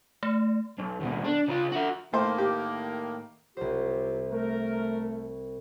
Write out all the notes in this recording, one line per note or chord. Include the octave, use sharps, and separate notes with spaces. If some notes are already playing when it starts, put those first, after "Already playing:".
A3
B1
D#2 B2
D4
C#3 F4
F#4 E5
A2 D#3 A3 A#3 C5
G4
C2 F#3 F4 G4 C5
A3 A#4